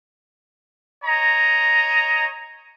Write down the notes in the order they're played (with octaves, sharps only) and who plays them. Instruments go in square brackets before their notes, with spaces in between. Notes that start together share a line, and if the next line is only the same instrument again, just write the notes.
[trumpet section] C#5 D#5 A#5